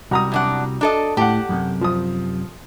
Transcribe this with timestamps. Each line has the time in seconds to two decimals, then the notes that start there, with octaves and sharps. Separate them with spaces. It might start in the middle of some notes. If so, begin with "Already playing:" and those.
0.11 C2 G3 F#4 A#5 D#6
0.32 F#2 D4 F#5
0.81 D4 A4 D#5
1.17 A2 G4 F#5 A5
1.49 F#2 A2 C3
1.81 F3 D#6